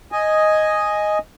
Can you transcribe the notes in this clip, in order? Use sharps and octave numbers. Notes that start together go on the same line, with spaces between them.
D#5 G#5